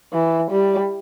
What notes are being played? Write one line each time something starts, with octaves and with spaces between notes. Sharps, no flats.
E3
G3